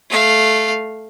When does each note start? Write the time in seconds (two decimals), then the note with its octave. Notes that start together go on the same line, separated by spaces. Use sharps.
0.10 A3 F5